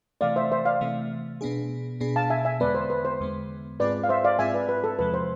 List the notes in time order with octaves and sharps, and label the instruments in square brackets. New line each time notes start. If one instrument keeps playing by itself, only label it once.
[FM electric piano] C3 E3 A3 [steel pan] D5 F5
[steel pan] C5 E5
C5 E5
D5 F5
[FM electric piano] C3 E3 A3
B2 B3 D4 G#4
B2 B3 D4 G#4
[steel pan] F5 A5
E5 G#5
E5 G#5
[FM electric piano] E2 D3 G#3 B3 [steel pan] B4 D5
[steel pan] C5
B4
C5
[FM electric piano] E2 D3 G#3 B3
[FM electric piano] G#2 G#3 C4 F4 G#4 [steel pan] B4 D5
[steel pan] F5
C5 E5
D5 F5
[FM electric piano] G#2 G#3 C4 F4 G#4 [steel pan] E5 G#5
[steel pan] B4 D5
B4
A4
[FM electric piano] E2 C3 F3 G#3 [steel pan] B4
[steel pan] C5